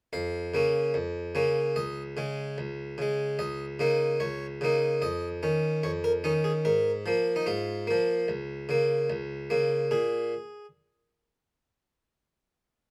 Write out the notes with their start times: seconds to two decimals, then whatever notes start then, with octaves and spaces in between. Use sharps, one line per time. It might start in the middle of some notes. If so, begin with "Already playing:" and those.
0.13 F2 F5
0.54 C#3 A#3 C#4
0.94 F2
1.35 C#3 A#3 C#4
1.76 C#2 D#5
2.17 C#3 G#3
2.58 C#2
2.98 C#3 G#3
3.39 C#2 D#5
3.79 C#3 A#3 D#4
4.20 C#2 C#5
4.61 C#3 A#3 D#4
5.02 F2 D#5
5.43 D#3 C#4
5.83 F2 C#5
6.04 A#4
6.24 D#3 C#4 D#4
6.44 G#4
6.65 G#2 A#4
7.06 F3 A#3
7.36 D#4
7.46 G#2 F4
7.87 F3 A#3
8.28 C#2
8.69 C#3 A#3
9.10 C#2
9.50 C#3 A#3
9.91 A#2 G#4